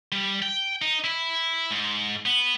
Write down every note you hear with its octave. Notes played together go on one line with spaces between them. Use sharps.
G3
G5
D#4
E4
G#2
B3